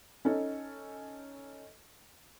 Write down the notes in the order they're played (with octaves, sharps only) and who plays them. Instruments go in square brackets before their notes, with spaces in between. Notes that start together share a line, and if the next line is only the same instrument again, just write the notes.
[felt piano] C#4 D#4 A4